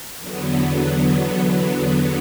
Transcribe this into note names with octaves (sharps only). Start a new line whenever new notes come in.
E2 D3 F#3 B3